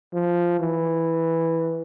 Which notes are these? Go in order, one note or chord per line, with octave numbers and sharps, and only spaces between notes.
F3
E3